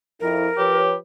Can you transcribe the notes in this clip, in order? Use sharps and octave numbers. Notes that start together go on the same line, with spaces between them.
F2 E4 A#4
F3 G4 B4 C#5